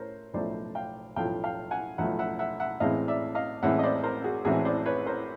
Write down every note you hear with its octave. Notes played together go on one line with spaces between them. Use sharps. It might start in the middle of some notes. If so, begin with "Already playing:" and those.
Already playing: A2 A#4 C5 C#5
B1 A2 F3 A3 C5 D5
F5 G5
B1 A2 F3 A3 F5 G5
F5 G5
F#5 G#5
B1 A2 F3 A3 E5 F#5
E5 F#5
E5 F#5
E5 F#5
A1 A2 E3 G#3 C4 D#5 F5
D5 E5
D#5 F5
A1 A2 E3 G#3 C4 E5 F#5
D#5
C5 D5
A#4 C5
F#4 G#4
A1 A2 E3 G#3 C4 F#4 G#4
C5 D5
B4 C#5
A#4 C5